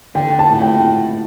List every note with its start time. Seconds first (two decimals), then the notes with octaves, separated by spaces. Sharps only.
0.15 D3 G5
0.39 A5
0.50 A2
0.62 G5